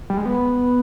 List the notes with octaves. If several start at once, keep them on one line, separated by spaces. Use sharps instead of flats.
G3
G#3
B3